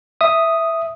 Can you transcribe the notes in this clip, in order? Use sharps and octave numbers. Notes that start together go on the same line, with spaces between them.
E5 D#6